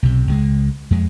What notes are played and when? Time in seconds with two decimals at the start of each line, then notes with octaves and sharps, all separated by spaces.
0.03 B1 C3
0.27 C#2 F#3 G#3
0.91 F2 G#3